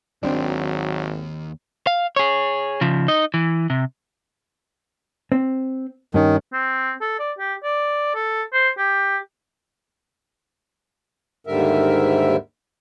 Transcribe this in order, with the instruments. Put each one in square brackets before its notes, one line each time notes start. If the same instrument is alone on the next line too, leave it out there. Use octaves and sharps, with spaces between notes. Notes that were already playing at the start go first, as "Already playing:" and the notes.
[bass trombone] G#1 [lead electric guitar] D#2 [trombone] F#3 [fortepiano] C4 D4
[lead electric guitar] F5
G#4 C#5
C#3 F3
D#4 D#5
E3
C3
[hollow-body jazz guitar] C4
[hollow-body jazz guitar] G2 C#4 [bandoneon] D#3
[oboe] C4
A4
D5
G4
D5
A4
C5
G4
[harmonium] D#2 G#2 D3 G3 A#4 E5